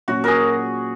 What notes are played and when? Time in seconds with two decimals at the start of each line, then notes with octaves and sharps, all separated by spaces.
0.08 A#2 F#3 C#4 F#4
0.24 G#4 A#4